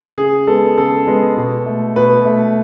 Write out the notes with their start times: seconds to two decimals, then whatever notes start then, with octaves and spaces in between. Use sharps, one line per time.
0.18 C#3 G#4
0.47 G#3 B3 A4
0.77 C#3 A4
1.07 G#3 B3
1.37 B2
1.66 A3
1.96 B2 B4
2.25 A3